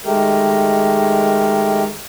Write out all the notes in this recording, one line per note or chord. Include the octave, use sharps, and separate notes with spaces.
D#3 G#3 A3 G4 A#4